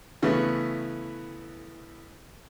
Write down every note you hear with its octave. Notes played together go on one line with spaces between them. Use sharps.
C#3 E3 A3 B3